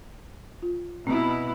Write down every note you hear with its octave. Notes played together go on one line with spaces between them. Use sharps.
F4
B2 C4 E4